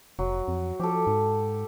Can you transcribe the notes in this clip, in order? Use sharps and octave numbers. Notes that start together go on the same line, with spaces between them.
F1 F#3
F2
F3 G4 A4
G#2